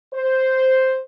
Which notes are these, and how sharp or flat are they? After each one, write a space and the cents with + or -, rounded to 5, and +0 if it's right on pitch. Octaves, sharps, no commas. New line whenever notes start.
C5 +0